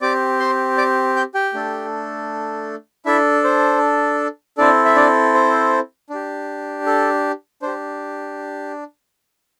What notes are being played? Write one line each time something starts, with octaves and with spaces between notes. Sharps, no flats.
C4 G4 D5 D6
C5 C6
D5 D6
G5 G6
G4 G5
A3 D4 A4
D4 E4 A4 E5
C5
C4 D4 E4 A4 D5
E5
D4 D5
C5
D4 G4
A4
D4 G4 C5